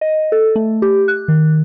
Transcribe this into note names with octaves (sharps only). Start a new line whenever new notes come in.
D#5
A4
A3
G4
F#6
D#3